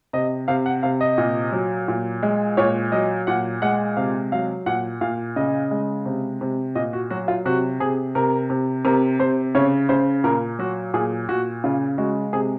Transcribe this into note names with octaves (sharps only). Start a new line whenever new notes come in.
C3 D#5
C3 F5
F#5
C3 F5
D#5
A#2
F#3
A#2
G#3
A#2 C#5
F#3 D#5
A#2 F#5
G#3 F#5
C3 F5
F#3 F5
A#2 F#5
A#2 F5
C#3 D#5
G#3
C3
C3
A#2 D#5
F#4
F#3 F#4
F4
C3 F#4
C3 G#4
C3 A#4
C3
C3 A#4
C3 C5
C#3 C#5
C#3 C5
A#2 A#4
F#3 F#4
A#2 G#4
A#2 F#4
C#3 F4
G#3 F#4
C3 G#4